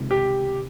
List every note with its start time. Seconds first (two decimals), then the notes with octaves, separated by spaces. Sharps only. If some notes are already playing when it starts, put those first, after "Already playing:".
Already playing: C#2 C3 D#3
0.11 G4